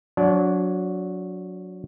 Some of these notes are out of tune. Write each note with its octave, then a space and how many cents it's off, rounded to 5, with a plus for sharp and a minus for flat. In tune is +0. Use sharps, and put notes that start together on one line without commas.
F#3 -15 D4 -35